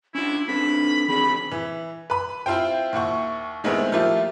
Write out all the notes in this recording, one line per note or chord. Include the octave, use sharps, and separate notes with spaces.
C#4 D4 E4 F4
C4 D4 A4 B4 B5
D#3 C4 D4 G#4 B5
E3
B4 B5
C4 E4 F4 C5 G5
D#2 E4 F#5 C#6
D#3 G#3 A3 B3 C4 E4
F3 A3 A#3 E4 F4 G4